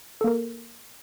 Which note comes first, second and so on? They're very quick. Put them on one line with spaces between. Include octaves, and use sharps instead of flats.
A4 A#3 A#4